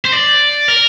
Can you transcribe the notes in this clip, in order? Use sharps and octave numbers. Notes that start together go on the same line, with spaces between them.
C5
D5
A#4